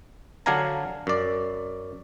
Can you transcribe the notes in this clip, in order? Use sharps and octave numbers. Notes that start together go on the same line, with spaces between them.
D3 F#3 D4 F5 G#5 A#5
F#2 D5